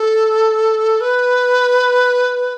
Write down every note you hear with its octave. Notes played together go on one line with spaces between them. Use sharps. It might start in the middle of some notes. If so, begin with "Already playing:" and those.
Already playing: A4
B4